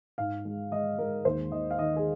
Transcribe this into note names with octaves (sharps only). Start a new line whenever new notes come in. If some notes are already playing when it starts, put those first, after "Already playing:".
G#2 F5
G#3
G#3 D#5
G#3 A#4
D#2 C5
D#2 D#5
F5
D#3 D#5
G#4